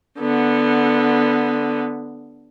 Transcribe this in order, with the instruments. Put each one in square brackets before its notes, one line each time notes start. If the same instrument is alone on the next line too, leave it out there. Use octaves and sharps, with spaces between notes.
[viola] D3 B3